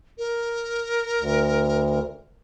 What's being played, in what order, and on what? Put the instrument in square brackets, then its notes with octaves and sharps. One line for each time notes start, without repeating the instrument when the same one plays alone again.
[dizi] A#4
[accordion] D2